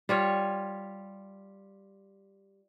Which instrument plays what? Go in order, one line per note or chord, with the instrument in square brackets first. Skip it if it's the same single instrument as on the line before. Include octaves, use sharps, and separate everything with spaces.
[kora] G3 F4 C#5